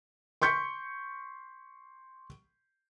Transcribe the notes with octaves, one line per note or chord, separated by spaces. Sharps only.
C6 C#6 G6 B6 C#7